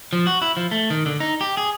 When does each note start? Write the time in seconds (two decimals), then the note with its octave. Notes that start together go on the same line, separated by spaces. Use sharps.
0.13 F3
0.27 F#4
0.42 E4
0.57 F3
0.71 A3
0.90 D#3
1.06 D3
1.20 D#4
1.41 G4
1.57 G#4